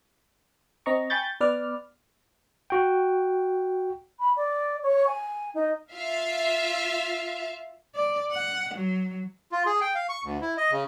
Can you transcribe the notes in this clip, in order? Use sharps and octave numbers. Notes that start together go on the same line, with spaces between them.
C4 D#5 A#5 C#6
G5 G#5 B5 C#6 G6 A6
B3 B4 D5 F6
F#4 G5
B5
D5
C#5
G#5
D#4
F4 E5 F5
D5
F#5
F#3
F4
G#4
G5
F5
C#6
D2
E4
D#5
C#3